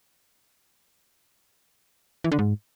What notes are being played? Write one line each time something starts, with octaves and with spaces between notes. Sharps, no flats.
E3
D3
G#2